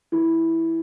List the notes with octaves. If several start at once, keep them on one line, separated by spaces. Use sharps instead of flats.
E3